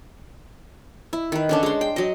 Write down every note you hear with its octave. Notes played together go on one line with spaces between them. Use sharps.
E4
D#3 B4
D3 C#4 D4
G#3 C6
G5
F#3 D#5